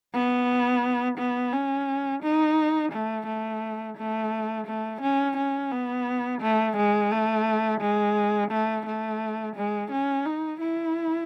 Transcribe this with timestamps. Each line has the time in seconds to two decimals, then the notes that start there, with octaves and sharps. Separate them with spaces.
0.14 B3
1.18 B3
1.52 C#4
2.22 D#4
2.92 A3
3.27 A3
3.97 A3
4.66 A3
5.02 C#4
5.37 C#4
5.72 B3
6.41 A3
6.77 G#3
7.12 A3
7.81 G#3
8.51 A3
8.86 A3
9.56 G#3
9.91 C#4
10.25 D#4
10.60 E4